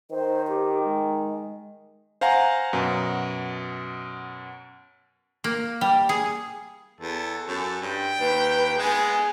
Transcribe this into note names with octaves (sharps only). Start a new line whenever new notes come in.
D#3 C5
G4
G#3
C5 F5 F#5 G#5 A#5
F#2 B2
A#3
G3
G#4
E2 A4
F#2
G2 G5
D#2 B4
G#3 B3 G#4